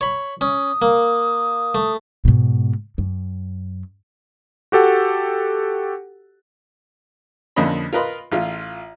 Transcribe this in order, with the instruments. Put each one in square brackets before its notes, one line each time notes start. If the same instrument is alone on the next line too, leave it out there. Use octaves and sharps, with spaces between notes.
[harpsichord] C#5 B5
[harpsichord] C#4 [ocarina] D#6
[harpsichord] A#3
A3
[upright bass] G#2 B2
F#2
[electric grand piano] F#4 G4 A4 F#5
[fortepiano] F2 D3 A#3 C#4 D#5 B5
F4 A#4 B4 D#5 B5 C6
A1 F4